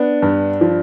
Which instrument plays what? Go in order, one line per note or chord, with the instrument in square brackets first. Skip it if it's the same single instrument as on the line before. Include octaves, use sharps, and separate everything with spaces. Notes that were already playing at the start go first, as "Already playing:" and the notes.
Already playing: [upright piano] B3 [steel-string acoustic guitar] D4
[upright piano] G2
F3